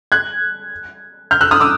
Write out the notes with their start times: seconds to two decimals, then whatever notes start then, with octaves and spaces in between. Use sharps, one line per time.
0.12 F#6 G#6
1.31 F6 G6
1.41 E6 F#6
1.51 D#6 F6
1.60 D6 E6